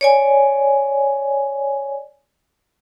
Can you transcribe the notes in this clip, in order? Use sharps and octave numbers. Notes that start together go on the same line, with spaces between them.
C#5 D5 G#5